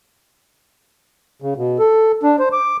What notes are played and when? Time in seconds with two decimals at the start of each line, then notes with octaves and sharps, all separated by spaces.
1.42 C#3
1.57 B2
1.79 A4
2.23 D4
2.39 C5
2.53 D6